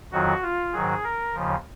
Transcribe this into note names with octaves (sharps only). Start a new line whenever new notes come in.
F2 D#3 F#3 F#4
F4
G#2 D#3 F#3 G#4
A#4
D#2 C#3 F3